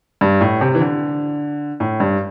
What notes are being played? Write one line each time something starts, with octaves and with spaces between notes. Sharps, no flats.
G2
A2
C3
E3
D3
A2
G2